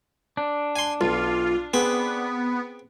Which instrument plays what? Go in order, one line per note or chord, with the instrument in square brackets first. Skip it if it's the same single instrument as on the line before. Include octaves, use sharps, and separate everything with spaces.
[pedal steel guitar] D4
[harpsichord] G#5 C6
[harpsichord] B1 [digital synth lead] F4
[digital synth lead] B3 [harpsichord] C4 G#4 B4